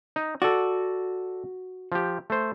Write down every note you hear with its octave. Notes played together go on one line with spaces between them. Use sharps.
D#4
F#4 A4 D5
F3 G4
A3 C5